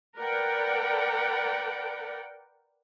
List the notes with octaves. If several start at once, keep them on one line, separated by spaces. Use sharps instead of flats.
A#4 B4 D5 F#5 G5